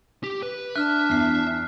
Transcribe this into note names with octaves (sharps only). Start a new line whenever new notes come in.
G4
B4
D4 E5 F6 F#6
E2 F6 C7